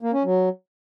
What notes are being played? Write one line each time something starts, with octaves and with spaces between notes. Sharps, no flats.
A#3
C#4
F#3